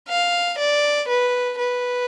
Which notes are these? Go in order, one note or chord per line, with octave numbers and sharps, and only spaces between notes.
F5
D5
B4
B4